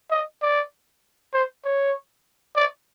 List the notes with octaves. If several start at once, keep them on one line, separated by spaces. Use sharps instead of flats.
D#5
D5
C5
C#5
D5